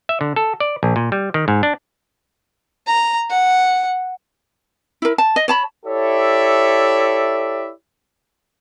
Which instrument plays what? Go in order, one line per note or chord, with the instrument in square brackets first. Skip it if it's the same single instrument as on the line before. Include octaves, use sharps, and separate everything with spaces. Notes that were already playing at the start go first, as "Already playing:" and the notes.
[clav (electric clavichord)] E5
D3
A4
D5
A#1
A#2
G3
D#3
G#2
D4
[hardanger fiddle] A#5
F#5
[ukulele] E4 A#4
A5
D#5
C#5 A5 B5
[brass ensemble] E4 G4 A4 C#5 D5 E5